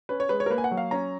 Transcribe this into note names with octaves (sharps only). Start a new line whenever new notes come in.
C#4 B4
C#5
G#3 B4
C#5
A#4
A#3 B4
G#5
F#5
F#3
F5
C#4 A#5